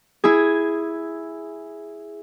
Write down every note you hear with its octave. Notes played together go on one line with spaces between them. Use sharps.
E4 G#4